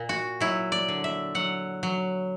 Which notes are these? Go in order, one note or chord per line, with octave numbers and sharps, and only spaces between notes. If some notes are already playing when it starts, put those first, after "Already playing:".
Already playing: A#2
F#4
F#3 E4
D5
D3
E5
F#3 F#5
F#3